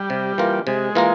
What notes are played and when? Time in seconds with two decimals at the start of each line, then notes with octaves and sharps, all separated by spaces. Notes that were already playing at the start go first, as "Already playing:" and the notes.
Already playing: G3
0.10 C3
0.38 E3 A#3 F4 A#4
0.67 C3 G#3
0.95 E3 A#3 F4 A#4